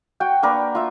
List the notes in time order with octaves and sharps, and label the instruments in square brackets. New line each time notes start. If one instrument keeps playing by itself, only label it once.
[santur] F#4 G5
A#3 D4 A#4 B4
F4 E5